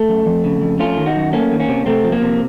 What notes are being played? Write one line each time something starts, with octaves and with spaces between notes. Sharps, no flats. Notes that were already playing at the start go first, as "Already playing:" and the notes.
Already playing: A3
F#2
F2
C#3
F2
A3 C#4 F4
D#3
D#4 F#4
F#2
A3 A#3 C#4
D#3
A#3 C#4
C3
C3 A3 C4
F3
A#3
C3